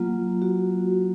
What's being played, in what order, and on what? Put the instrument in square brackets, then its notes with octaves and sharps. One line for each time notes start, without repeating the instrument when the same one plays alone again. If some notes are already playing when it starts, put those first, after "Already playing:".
Already playing: [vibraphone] F#3 A#3 F4
F#4